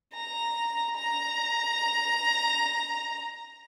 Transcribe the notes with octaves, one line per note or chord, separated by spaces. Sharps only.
A#5
A#5